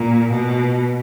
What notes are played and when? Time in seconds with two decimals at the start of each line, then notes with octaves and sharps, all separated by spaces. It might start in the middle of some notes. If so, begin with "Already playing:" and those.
Already playing: A#2
0.30 B2